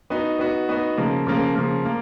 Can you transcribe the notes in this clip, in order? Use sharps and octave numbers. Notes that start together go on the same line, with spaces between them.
B3 D#4 F#4
B3 D#4 F#4
B3 D#4 F#4
C#3 F3 A#3
C#3 F3 A#3
C#3 F3 A#3
A#3